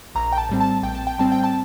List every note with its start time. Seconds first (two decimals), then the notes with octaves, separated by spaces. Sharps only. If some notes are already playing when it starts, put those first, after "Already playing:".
0.15 A#1 A#5
0.32 G5
0.38 A5
0.49 A2 G3 C4
0.61 A5
0.83 A#1 G5
0.95 A5
1.07 G5
1.18 A2 G3 C4 A5
1.32 G5
1.44 A5